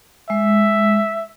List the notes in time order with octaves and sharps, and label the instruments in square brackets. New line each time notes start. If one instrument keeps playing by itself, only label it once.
[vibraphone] G#3 [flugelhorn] E5